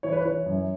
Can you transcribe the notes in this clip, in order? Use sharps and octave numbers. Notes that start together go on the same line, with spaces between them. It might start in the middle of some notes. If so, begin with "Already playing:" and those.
E3 C#5
B4
E3 C#5
F#2